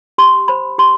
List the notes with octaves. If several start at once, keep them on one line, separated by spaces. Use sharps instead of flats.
G4 C6
C5 B5
G4 C6